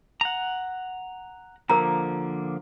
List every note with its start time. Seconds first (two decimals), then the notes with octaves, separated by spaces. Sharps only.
0.21 F#5 A#5
1.69 D3 F3 A#3 A#4 A#5